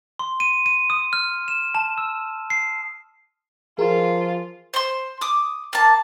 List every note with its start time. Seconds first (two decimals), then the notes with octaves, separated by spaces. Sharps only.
0.19 C6
0.40 D#7
0.66 D#7
0.90 D#6
1.13 F6
1.48 E7
1.75 A5
1.98 E6
2.50 C7
3.79 F3 F4 G#4 A#4
4.74 C5 C6
5.21 D6 D#6
5.73 A#3 A5